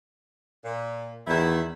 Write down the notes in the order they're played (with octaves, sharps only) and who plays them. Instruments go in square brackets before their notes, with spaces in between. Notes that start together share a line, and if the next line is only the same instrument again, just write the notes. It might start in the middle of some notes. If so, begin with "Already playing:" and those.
[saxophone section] A#2
[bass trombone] E2 [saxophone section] D#3 E4